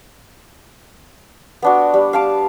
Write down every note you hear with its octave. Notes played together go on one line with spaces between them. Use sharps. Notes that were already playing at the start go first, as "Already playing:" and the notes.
B3 D4 F#4
G3
F5 A5 D6